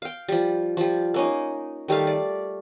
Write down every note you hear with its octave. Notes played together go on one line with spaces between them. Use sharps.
F5 G5
F3 G3
F3 G3
A#3 C#4 D#4
D#3 G3 A3 F5
D5